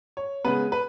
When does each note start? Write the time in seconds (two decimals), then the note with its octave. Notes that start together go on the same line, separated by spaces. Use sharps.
0.17 C#5
0.44 C#3 G#3 B3 B4
0.72 B4